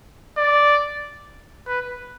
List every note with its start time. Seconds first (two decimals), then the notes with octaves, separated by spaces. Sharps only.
0.38 D5
1.67 B4